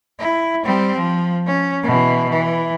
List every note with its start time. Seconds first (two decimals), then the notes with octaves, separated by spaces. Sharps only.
0.19 E4
0.64 G3 C4
0.97 F3
1.47 C#4
1.83 B2 E3
2.29 E3